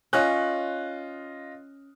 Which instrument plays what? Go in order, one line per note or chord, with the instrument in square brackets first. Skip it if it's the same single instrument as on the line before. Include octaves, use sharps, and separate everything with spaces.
[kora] C#4 C#5 [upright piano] F4 D#5 F#6